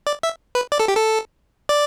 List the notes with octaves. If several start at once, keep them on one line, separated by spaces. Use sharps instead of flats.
D5
E5
B4
D5
A4
G4
A4
D5